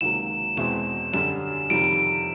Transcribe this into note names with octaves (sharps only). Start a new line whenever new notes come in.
C#2 C3 D#3 F#3 A#3 E7
E2 B2 G#3 C4 E4 E7
F#2 D3 G3 E7
F2 C3 D#3 G3 D7